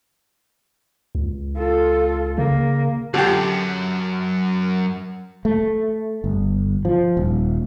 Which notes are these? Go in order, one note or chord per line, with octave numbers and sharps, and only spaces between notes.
C#2
F4 A4
C#3 A#3
F#2 D3 G4
A3
G1
F3
D#1